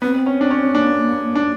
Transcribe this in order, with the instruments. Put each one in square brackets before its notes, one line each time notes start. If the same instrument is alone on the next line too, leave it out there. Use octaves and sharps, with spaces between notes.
[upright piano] B3 [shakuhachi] C4
[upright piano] C#4
D4
C#4
[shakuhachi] A#3 [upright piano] D4
[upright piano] D4